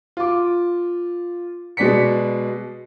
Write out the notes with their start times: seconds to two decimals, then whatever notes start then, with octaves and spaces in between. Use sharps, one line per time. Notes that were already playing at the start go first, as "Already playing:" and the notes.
0.17 F4 D6
1.77 B2 G#3 D5 B6 C#7